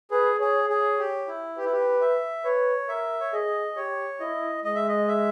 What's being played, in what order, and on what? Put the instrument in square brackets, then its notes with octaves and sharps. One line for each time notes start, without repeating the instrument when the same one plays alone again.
[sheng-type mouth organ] G#4 [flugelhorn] B4
[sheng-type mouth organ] G#4 [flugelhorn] C#5
[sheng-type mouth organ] G#4 [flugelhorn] C#5
[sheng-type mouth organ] G4
E4
[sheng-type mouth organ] G4 [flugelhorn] B4
[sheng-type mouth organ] E4
G4
E5
[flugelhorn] B4 [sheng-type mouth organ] C#5
[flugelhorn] A#4 [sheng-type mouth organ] E5
[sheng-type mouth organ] C#5
[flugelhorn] G#4 [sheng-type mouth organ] D#5
[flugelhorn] G4 [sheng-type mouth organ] C#5
[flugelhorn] E4 [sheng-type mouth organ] D#5
[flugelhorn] G#3 [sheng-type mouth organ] D#5
[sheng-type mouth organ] E5
D#5
E5